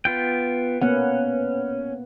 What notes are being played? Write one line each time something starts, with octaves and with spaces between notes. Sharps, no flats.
B3 F4 G5
A#3 B3 C#4 F#5